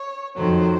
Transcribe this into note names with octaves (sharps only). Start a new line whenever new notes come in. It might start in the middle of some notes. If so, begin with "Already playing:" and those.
Already playing: C#5
F2 D#3 F#3 A3 C5